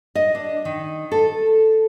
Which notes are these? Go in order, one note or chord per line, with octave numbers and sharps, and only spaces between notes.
D#5
D4
D#3
A4